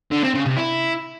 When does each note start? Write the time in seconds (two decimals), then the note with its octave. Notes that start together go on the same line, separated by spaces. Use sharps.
0.11 D3
0.23 C4
0.34 C#3
0.46 C3
0.57 E4